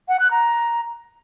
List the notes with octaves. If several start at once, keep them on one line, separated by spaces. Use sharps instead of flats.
F#5
F#6
A#5